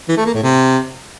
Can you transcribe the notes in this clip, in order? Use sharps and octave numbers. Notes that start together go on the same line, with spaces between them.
E3
A3
A#3
A2
C3